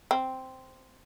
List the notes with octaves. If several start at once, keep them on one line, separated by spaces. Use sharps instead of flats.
C4